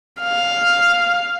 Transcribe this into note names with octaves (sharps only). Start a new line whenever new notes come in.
F5